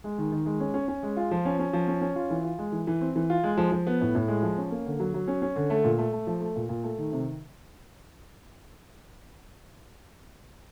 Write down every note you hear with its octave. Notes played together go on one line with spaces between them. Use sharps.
G#3
D#3
D#3
G#3
C#4
C#4
C#4
G#3
F4
F3
C#4
C#4
F3
C#4
C#4
F4
E3
F4
G#3
E3
E3
C4
E3
F4
G#3
F3
F3
B3
A2
A2
G#3
F3
C#4
A#3
D3
F#3
F#3
C#4
C#4
D3
A3
A#2
A3
A3
F3
A3
A#2
A#2
A3
D#3
C3